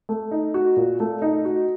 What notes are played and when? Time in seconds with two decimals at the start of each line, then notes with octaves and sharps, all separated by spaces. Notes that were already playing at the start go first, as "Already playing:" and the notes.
0.09 A3
0.31 D#4
0.54 F#4
0.77 A#2
1.00 A3
1.22 D#4
1.45 F#4